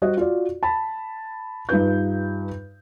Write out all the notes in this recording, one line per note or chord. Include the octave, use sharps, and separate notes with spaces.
G3 F#4 C5 D#5
F4 F#4 D5
A5 B5
G2 D#4 F4 B4 G6